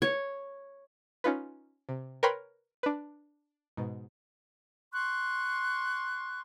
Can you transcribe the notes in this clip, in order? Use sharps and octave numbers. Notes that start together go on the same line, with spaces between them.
C#5
C#4 D#4 F4 B4
C3
A#4 B4 C#5 G5 B5 C6
D4 B4
G#2 B2
C6 C#6 F#6